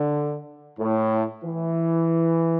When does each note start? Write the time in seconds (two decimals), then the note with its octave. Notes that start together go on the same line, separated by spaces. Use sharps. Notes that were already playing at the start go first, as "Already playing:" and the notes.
Already playing: D3
0.79 A2
1.44 E3